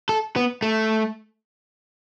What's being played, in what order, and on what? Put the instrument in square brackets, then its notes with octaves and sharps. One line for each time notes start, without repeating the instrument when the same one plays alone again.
[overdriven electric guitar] A4
B3
A3